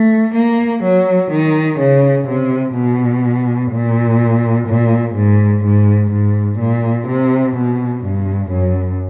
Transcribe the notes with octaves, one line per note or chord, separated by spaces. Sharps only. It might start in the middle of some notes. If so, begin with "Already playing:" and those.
Already playing: A3
A#3
F#3
D#3
C#3
C3
B2
A#2
A#2
G#2
G#2
G#2
A#2
C3
B2
G2
F#2